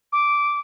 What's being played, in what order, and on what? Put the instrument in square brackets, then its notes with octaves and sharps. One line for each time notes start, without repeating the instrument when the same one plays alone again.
[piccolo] D6